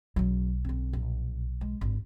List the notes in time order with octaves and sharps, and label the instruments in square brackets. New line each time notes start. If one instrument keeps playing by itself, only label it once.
[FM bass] B1 [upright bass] C#3 F#3
[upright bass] D3 C4
A#1
G#3
G#1 D3